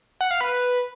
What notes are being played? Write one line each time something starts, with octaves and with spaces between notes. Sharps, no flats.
F#5
F5
B4